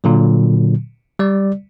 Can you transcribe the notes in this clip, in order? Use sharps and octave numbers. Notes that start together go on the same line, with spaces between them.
A#2 D3 F#3
G3 D5